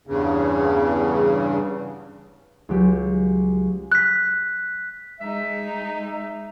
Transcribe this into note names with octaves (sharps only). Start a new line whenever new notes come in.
E2 G2 C#3
C#2 F#3 G4
F#6 B6
G#3 D#4 E5